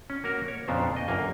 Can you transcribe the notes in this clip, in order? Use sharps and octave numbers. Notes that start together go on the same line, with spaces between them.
C#4
A#3 F#4 A#4
C#5
F2 A#2 C#3 B3 D4 C5
D#5 G5
G1 F#2 A#3 G#5